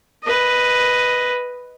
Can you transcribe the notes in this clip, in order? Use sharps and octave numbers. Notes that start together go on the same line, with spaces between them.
B4 D#5